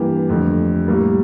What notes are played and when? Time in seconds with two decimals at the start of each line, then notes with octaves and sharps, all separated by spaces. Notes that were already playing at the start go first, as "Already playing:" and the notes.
Already playing: G2 E3 A#3 G4
0.29 F2 D3 A3
0.88 A2 G3 A#3